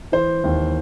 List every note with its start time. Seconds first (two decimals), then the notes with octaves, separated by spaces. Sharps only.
0.12 E3 C5
0.44 D#2